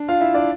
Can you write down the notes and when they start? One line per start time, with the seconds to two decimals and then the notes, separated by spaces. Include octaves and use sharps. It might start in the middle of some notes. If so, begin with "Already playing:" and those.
Already playing: D4
0.08 F4 F5
0.21 E4 E5
0.34 D4 D5